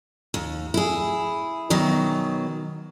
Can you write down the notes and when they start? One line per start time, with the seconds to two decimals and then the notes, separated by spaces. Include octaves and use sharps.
0.34 D#2
0.74 E4 G#4
1.70 B2 D#3 F#3